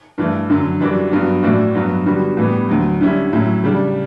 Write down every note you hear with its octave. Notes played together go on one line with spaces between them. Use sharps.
G2 E3 A3
F#2 D3 F#3
F#2 E3 G3 D4 F#4
G2 F#3 B3 F#4
A2 E3 A3 D4 F#4
G2 F#3 B3 F#4
D3 G3 B3 F#4
A2 E3 G3 B3
D2 D3 F#3
D3 G3 C#4 E4
A2 F#3 C#4 E4
C#3 G3 D4